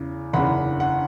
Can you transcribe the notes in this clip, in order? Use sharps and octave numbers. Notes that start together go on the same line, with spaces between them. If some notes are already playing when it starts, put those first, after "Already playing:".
Already playing: E2 C#3
F#1 E2 C#3 F#5 B5
F#5